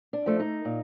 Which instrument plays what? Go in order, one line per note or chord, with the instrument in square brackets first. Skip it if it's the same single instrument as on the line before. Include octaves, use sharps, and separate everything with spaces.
[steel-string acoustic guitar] D4
F3 A3
D#4
A#2